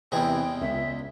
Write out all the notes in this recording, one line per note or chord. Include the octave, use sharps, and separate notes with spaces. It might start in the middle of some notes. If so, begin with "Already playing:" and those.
E2 C3 E3 G#3 G5
C#2 E5